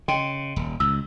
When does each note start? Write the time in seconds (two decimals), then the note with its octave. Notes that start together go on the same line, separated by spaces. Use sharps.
0.08 C#3 D#5 G5 C6
0.56 D#1
0.80 C#2 E6